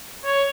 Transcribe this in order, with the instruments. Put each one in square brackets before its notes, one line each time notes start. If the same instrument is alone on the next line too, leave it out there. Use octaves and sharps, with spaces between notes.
[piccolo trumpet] C#5